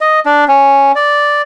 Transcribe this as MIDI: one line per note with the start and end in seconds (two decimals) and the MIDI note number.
0.01 0.20 75
0.26 0.44 62
0.48 0.92 61
0.95 1.42 74